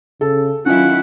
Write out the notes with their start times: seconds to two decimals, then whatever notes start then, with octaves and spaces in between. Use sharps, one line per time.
0.21 C#3 A4
0.66 D#3 F#3 C#4 E4 F4 F#5